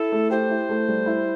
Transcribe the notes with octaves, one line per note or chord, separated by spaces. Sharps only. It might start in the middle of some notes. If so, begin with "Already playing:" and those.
Already playing: E4 A4
A3
G4 C5
E4
A3
G3
E4